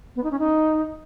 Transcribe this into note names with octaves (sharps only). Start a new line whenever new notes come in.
B3
D#4
C#4
D#4